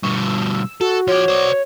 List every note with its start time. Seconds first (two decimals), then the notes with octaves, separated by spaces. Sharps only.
0.03 G2 B2 C#6
0.20 E6
0.81 F#4 A4
1.08 F3 C#5 D5
1.28 C5 D5